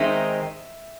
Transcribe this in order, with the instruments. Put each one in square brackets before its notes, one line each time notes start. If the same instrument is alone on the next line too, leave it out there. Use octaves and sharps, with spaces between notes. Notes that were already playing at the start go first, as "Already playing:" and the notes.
Already playing: [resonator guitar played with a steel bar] D#3 G#3 C4 D#4 [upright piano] E5